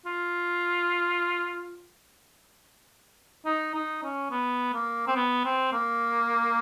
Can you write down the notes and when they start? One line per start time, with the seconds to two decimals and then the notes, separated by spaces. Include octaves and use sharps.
0.06 F4
3.45 D#4
3.75 D#4
4.03 C#4
4.31 B3
4.73 A#3
5.08 C4
5.16 B3
5.45 C4
5.73 A#3